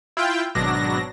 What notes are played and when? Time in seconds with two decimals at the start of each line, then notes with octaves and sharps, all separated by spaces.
0.17 E4 F4 G5
0.55 G#1 B2 F#3 D4 A#6